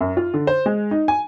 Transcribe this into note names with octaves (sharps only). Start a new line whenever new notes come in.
F#2
F4
D3
C5
G#3
D#4
G#5